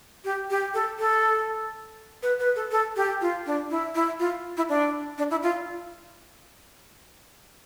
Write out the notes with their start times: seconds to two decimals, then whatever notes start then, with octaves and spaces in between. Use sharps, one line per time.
0.24 G4
0.50 G4
0.74 A4
0.99 A4
2.23 B4
2.39 B4
2.56 A4
2.71 A4
2.96 G4
3.21 F4
3.46 D4
3.70 E4
3.95 E4
4.19 F4
4.57 E4
4.69 D4
5.18 D4
5.31 E4
5.43 F4